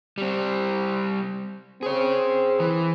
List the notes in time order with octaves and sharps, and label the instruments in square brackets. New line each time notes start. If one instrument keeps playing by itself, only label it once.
[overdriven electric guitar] G3 C4
[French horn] C4 [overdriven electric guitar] G#4 C#5
[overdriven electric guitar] E3